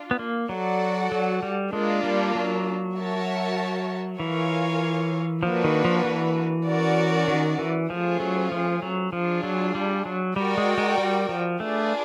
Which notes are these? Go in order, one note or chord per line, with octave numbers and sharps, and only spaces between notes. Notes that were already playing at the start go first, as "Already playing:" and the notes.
Already playing: D4 F4
B3
A#3
F#3 F#4 A4 D5 F#5
F#3
G3
G#3 A#3 D4 F4
G3
F#3
F#4 A#4 C#5 E5 A5
E3 F4 A#4 C#5 F5 G#5
F3 A#3 D4 F#4 B4
D#3
F3
E3
C#4 F#4 A#4 D5
D#3
E3
F3 A3 C#4 F4 G#4 C5
F#3
F3
F#3
F3 D4 F4 G#4
F#3
G3
F#3
G3 F#4 A#4 D5 G5
G#3
G#3
G3
F3
A3 D4 F4 G#4 B4 D5